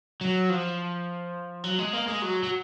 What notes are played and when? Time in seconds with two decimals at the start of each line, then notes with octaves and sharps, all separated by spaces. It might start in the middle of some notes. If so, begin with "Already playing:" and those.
0.21 F#3
0.50 F3
1.64 F#3
1.79 G#3
1.93 A#3
2.07 G#3
2.22 F#3
2.43 F#3